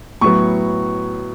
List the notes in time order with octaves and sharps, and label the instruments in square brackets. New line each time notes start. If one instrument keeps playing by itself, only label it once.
[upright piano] A2 F#3 B3 C#6